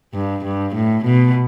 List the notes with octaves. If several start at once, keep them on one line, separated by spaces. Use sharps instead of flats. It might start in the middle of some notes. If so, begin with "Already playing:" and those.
G2
G2
A2
B2